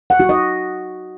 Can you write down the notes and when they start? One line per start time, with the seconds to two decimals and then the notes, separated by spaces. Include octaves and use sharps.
0.10 F#5
0.20 F#4
0.29 D#5